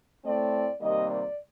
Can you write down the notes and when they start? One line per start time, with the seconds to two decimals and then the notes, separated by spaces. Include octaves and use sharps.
0.23 A2 A3 C4 D5
0.79 C3 D#3 G3 A#3 D#5
1.07 D5